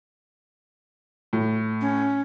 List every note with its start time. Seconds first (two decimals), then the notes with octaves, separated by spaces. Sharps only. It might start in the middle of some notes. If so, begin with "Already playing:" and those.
1.33 A2
1.81 C#4